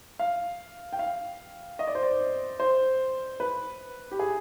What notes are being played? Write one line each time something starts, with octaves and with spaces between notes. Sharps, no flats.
F5
G5
F5
D#5
D5
C5
D5
C5
B4
G4
G#4